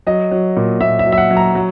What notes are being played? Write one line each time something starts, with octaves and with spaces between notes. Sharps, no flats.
F#3 D#5
F#3
A#2
A#2 E5
E5
F#3
E5
F#5
F#3
A#5
F#3